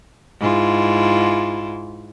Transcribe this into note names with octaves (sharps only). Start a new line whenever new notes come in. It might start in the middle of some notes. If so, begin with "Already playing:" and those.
G#2 E4 F4